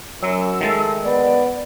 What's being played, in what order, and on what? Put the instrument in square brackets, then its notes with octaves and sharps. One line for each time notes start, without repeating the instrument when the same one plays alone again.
[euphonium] F#2 [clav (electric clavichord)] F#3 [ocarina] E6
[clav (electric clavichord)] D#3 G#3 A5 [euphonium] A3
[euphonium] B3 [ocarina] D5